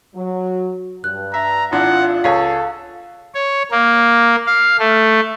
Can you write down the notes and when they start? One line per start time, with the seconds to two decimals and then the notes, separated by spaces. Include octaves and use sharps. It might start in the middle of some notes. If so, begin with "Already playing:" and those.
0.14 F#3
1.04 G2 F#6
1.34 E5 A#5
1.72 G#1 D4 E4 F4 F#5
2.24 C#2 G#4 A4 C#5 F5
3.35 C#5
3.71 A#3
4.47 F5
4.79 A3